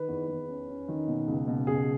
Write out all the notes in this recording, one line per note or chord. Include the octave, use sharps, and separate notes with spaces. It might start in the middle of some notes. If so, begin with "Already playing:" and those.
Already playing: D#3 B4
E2
E2
C#4
C#4
D#3
B2
C#2
B2
C#2 G#4